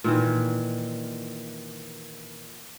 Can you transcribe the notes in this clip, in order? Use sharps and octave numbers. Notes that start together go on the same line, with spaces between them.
A#2 D#3 E3